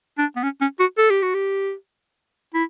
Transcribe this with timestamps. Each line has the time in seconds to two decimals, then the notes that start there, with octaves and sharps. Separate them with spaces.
0.18 D4
0.36 B3
0.43 C#4
0.61 C#4
0.80 F#4
0.98 A4
1.10 G4
1.22 F#4
1.34 G4
2.54 E4